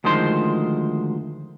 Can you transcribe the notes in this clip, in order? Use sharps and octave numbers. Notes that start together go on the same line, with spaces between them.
D2 D#3 F3 G#3 C5 C6